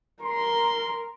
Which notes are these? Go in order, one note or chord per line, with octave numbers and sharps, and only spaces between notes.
A#4 C6